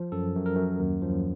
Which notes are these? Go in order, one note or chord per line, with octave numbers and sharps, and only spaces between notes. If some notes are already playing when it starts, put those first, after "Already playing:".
Already playing: F3
F#2 A4
F#2
A#4
F#2
D#2
F3